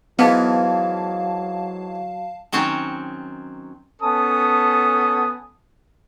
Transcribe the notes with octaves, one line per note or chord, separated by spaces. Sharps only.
G#2 E3 F#3 B3 D#4 F5 A5
D#3 F#3 C4 C#4 C#5
B3 C#4 A4 G#5 A5 D#6